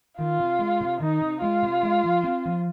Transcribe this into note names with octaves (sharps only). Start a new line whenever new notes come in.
D#3 F4
C3
G#3
C3
D#3 D#4
C3
G#3 F4
C3
G#3
F3
C4
F3